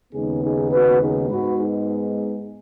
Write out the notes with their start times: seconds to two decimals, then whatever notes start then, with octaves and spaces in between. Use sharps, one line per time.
0.13 D#2 C#3 G#3 B3 D#4 G#4
0.43 D#4 G#4
0.72 F#4 B4
1.01 D#4 G#4
1.30 G#2 G#3 B3 F#4 B4
1.59 D#4 G#4